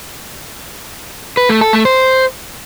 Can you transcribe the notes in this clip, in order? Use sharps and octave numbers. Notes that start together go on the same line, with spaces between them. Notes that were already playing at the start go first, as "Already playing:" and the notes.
B4
A3
A4
A3
C5